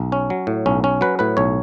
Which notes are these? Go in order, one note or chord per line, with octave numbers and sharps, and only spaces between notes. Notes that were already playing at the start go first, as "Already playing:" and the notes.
Already playing: B1
C#4
F#3
A2
B1 C#4
C#4
F#3 B4
A2 B4
B1 C#5